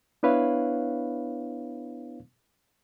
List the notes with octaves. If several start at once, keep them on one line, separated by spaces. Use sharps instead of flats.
B3 D4 E4 B4 C#5 F5